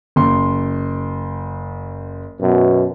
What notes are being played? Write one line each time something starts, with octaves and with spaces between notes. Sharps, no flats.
F#1 C6
F#2 B2